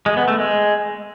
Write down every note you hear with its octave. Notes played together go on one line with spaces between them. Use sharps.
G#3
B3
A3
G#3